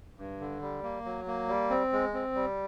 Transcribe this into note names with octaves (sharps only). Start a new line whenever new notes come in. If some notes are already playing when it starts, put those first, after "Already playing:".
G2
D3
G3
A#3
F#3
A#3
G3
C4
G#3
C4
G3